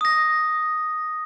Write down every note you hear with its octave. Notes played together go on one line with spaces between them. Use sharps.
D#6 A#6